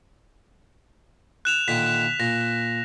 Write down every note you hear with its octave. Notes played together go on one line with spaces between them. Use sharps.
F#6 E7 F7
A#2 D3 D#3 B6
A#2 A#6